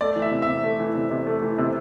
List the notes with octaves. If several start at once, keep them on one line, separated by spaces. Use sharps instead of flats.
A3 D5
E3
E5
C3
E5
C3
A3
E3
C3
C3
A3
E3
C3